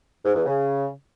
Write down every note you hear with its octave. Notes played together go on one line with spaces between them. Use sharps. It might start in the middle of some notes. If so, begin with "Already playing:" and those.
G#2
E2
C#3